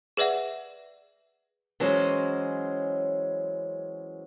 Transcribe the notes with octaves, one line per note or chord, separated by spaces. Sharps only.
G#4 B4 D5 E5 F#5
E3 F#3 G#3 C#4 C5